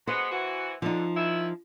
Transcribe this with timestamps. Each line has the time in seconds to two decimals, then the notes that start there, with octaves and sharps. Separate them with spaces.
0.07 F#3 G#3 B3 C5
0.31 E3 F#4
0.82 D3 F3 D#4
1.17 D#3 E4